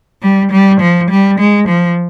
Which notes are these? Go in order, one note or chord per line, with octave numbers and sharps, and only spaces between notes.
G3
G3
F3
G3
G#3
F3